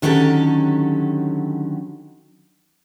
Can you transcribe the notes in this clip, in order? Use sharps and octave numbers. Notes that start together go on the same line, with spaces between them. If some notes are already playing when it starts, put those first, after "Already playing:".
D3 D#3 F#3 C#4 G4 A4